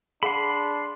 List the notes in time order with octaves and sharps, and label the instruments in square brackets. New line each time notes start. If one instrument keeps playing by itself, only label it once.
[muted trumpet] D4 [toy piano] G#4 F5 F#5 [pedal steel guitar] B5 C6